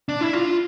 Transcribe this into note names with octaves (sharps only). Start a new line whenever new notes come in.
D4
E4
F4